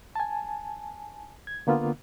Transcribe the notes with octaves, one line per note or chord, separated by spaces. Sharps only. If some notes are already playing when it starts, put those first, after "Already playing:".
G#5 A5
G#6
D3 A#3 B3 F4